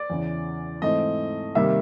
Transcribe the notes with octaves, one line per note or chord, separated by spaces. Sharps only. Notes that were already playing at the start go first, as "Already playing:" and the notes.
Already playing: D5
E2 C#3 E3
G#2 E3 A3 C4 D#5
C3 D#3 G3 A#3 E5